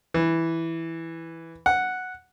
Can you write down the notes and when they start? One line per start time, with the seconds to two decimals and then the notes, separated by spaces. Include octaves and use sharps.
0.14 E3
1.66 F#5